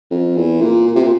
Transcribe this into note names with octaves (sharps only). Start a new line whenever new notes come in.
F2
E2
A#2
A#2
C3
A#2